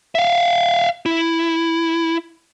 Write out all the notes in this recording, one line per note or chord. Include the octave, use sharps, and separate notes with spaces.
E5 F5
E4